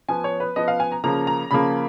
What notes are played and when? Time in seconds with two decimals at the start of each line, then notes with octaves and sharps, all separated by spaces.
0.09 F3 B3 G#5
0.24 C#5
0.40 B4
0.56 F3 B3 D#5
0.68 F5
0.80 G#5
0.92 A#5
1.04 C#3 F3 A#3 A#5
1.27 A#5
1.51 C#3 F3 A#3 B5